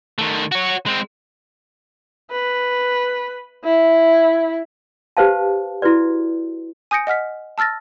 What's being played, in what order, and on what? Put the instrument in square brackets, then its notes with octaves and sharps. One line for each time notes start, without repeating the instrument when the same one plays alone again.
[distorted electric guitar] D#3 A3
F#4 C#5
G#3 C4
[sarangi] B4
E4
[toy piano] G4 B4 C5 F5 A5
E4 F#4 B4 D5
[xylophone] G#5 D#6 G6 A#6 C#7 D7
D#5 F#5 F6 B6
A5 E6 F6 A6 A#6